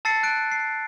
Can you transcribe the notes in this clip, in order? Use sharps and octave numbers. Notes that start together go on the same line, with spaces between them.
A5 E6 A6 C7 C#7
F#6 D7
C7